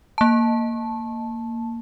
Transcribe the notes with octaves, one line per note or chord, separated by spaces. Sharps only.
A#3 A5